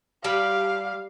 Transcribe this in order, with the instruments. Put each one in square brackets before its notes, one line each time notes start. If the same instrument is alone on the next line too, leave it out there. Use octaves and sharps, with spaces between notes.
[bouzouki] G3 [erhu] F5